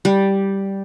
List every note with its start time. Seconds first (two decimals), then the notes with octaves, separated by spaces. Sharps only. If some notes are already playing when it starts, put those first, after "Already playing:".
0.05 G3